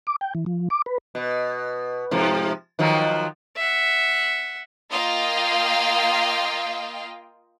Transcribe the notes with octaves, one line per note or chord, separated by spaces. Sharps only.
D6
G5
E3
F3
D6
B4
B2
G#2 C3 F3
D#3 F3 F#3
E5 F#5
A#3 F4 D#5 F5 G5